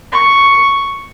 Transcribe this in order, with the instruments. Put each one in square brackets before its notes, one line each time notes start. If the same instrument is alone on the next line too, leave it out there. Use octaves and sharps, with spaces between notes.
[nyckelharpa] C#6